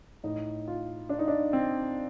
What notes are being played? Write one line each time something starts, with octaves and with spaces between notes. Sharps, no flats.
A2 D#4
F4
D4
D#4
D4
C4